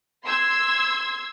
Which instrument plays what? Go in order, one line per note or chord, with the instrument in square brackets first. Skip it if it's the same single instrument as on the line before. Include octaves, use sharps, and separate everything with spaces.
[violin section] C6 E6 G#6